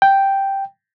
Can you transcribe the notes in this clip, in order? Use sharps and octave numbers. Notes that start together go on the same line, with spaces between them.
G5